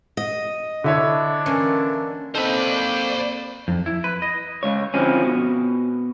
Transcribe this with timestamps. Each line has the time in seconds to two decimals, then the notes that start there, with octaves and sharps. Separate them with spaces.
0.17 D#5
0.84 D3 D4 E4 C#5
1.46 E3 A#3 C#4
2.35 A#3 C4 D#4 A4 C5 B5
2.57 D5
3.68 F2
3.86 E4
4.04 B4
4.22 D#5
4.63 C#2 C#5
4.94 D3 F3 C4 C#4
5.24 B2